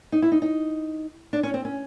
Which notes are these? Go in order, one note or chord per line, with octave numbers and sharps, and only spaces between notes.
D#4
E4
D#4
D#4
D4
C#4
C4
C#4